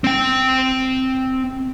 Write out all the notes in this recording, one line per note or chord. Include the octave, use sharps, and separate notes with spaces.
C4 G5